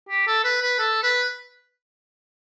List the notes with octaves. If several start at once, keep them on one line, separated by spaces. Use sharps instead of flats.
G4
A4
B4
B4
A4
B4